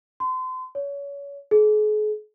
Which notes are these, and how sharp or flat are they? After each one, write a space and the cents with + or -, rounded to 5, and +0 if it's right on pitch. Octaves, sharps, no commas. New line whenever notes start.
C6 -35
C#5 +30
G#4 +40